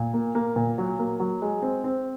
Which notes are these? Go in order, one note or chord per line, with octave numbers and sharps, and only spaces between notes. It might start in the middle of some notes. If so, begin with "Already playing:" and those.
Already playing: A#2
A#3
A#3
A#2
F#3
A#3
F#3
G#3
C4
C4